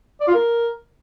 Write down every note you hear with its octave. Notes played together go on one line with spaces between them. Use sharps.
D5
F4
A#4